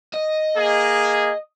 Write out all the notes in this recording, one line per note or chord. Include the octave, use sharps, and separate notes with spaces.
D#5
A#3 G#4